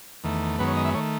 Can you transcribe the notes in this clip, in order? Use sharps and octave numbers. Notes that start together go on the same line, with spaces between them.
E2 D#3 A3
F#2 D#3 G#3 B3 B4
C#5
D#5
E5
D#3 A3 C#5